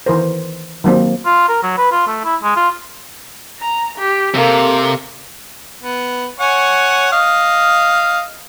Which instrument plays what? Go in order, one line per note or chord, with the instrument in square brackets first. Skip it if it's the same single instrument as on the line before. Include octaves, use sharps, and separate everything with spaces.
[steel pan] D#3 E3 A#4 C5
D#3 F#3 A#3 C4
[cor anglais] F4
A#4
F#3
B4
F4
A3
E4
G#3
F4
[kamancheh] A#5
G4
[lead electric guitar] C3 [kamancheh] A#3 A4
[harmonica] B3
C#5 F#5 G#5
D#5 F5